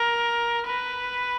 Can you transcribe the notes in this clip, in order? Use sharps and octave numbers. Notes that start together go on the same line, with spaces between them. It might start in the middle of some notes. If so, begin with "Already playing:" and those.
Already playing: A#4
B4